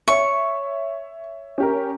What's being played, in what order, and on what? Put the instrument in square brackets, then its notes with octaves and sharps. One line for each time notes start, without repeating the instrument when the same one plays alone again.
[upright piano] C#5 E5 [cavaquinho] C#6
[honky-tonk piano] C#4 G4 A#4